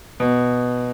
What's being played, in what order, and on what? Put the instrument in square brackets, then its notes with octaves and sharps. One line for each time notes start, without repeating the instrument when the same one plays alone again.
[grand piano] B2